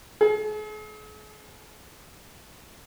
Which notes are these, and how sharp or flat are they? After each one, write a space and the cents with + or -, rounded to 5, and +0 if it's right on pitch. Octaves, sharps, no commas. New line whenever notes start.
G#4 +45